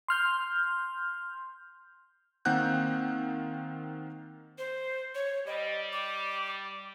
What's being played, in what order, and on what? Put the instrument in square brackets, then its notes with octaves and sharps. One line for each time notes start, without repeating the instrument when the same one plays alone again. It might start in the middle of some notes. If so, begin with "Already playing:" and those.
[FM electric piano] C6 F6 G6
[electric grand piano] D#3 A#3 C4 F#5 F#6 G6
[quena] C5
C#5
[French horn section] G3 [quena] D#5
[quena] D6